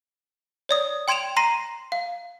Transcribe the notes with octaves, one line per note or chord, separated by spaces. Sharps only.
C#5 D5 D#6
G5 C6 G#6 D7 E7 F7
A#5 C6 A#6 C7 D#7
F5